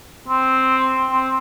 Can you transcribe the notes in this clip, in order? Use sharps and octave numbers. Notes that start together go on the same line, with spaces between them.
C4
C4